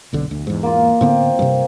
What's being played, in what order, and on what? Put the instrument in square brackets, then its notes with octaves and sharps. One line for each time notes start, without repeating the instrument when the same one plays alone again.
[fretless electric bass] F#1 B1 D3
D2
E2 G#2
[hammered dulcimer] A#3 F4
[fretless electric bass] A2 D3 B3 [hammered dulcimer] C4
[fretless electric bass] G2 C3